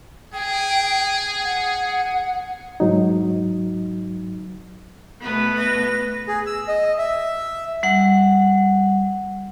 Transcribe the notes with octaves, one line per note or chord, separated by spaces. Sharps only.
G#4 G5
F#5
G#2 F#3 D#4
B2 A3 B3 B4
A#6
G#4
E6
D#5
E5
G3 F#5